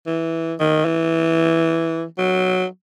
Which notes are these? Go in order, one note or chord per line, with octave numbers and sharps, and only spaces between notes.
E3
D#3
E3
F#3